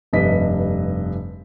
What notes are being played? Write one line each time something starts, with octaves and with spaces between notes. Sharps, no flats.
F1 G2 C3 B4 D#5 B6